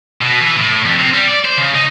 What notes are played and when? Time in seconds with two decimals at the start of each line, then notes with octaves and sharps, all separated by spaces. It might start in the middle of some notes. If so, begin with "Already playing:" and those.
0.21 B2
0.41 E3
0.56 A2
0.85 F2
0.99 C3
1.14 G3
1.28 D5
1.45 C5
1.58 C#3
1.75 D#4